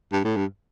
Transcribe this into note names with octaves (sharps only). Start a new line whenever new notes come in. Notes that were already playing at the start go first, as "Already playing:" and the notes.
G2
A2
G2